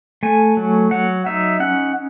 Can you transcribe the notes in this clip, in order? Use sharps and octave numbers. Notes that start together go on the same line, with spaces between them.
A3 G#5
F#3
F#3 F#5
D#4 E5
C#4 F#5